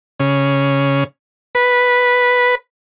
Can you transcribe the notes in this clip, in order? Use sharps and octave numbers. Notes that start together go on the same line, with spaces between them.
C#3
B4